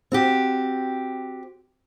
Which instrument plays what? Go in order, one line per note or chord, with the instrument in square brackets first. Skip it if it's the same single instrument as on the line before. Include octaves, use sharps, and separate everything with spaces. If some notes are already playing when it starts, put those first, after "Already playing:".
[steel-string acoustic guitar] C4 F#4 G4